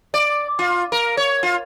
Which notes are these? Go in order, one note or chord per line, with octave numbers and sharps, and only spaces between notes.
D5
F4
A#4
C#5
F4